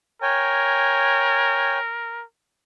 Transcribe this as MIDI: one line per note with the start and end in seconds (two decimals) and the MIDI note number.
0.22 2.23 70
0.22 1.78 73
0.22 1.78 79
0.22 1.78 80